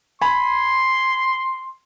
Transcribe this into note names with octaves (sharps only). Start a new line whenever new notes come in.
G#5 B5 C6